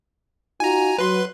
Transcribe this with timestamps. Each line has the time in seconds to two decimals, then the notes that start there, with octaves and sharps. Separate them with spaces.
0.60 D#4 F4 F#4 G#5 A#5
0.99 F#3 B4 C6